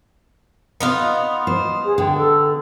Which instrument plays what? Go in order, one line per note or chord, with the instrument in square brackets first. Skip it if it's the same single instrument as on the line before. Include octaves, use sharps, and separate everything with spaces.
[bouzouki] B3 D#4 F4
[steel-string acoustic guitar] C5
[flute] G#4
[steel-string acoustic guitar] D3 [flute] G5
[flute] A4